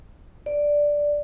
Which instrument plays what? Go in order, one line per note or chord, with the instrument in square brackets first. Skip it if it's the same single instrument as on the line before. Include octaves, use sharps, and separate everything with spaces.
[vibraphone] D5